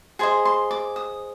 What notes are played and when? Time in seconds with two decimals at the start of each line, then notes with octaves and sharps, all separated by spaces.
0.19 G#4 C5 D#5 G#5
0.45 C6
0.71 D6
0.96 D#6